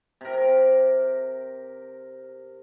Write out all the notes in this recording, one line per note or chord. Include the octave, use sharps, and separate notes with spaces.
C3 A#4